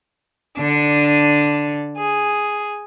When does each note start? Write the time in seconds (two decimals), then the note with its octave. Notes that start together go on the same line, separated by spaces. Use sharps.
0.58 D3 D4
1.97 G#4